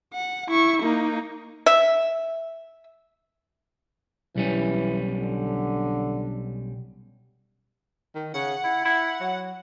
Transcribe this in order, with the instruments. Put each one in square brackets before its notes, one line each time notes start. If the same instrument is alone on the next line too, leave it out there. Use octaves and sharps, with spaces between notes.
[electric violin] F#5
E4 C#6
A#3 D#4
[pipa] E5
[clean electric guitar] B1 G3 C#4 [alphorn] E3
[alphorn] D3
[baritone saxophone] D#3
[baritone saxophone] C#3 [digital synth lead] F#5
[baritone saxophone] E4
E4
F#3